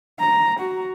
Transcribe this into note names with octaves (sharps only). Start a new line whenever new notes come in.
A#5
F#4